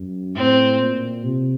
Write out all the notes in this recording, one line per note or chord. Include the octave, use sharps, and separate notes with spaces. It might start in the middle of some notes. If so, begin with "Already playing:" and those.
Already playing: F#2
A2 C4
A#2
C3